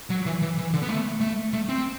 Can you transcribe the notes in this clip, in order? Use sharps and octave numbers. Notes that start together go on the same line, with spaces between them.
F#3
E3
E3
E3
D3
B3
A3
A3
A3
C4